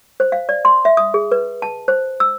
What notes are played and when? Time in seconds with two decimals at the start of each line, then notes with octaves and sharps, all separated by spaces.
0.20 C5
0.32 F5
0.49 D5
0.65 C6
0.85 E5
0.97 D#6
1.14 G#4
1.32 B4
1.62 A5
1.88 C5
2.20 E6